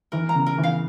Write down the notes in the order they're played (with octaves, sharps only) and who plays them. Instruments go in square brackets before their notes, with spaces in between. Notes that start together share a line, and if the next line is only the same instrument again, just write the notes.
[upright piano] E3 [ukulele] A#4
[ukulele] A#5
[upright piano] C#3
[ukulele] A#4
[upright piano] E3
[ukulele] F5